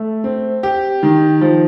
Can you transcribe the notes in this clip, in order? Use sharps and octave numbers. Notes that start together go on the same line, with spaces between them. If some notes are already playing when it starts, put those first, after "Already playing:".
Already playing: A3
C4
G4
D#3
F3